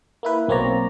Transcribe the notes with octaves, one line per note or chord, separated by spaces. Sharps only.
A#3 E4 B4
B1 A#3 C4 C#5 D5 A#5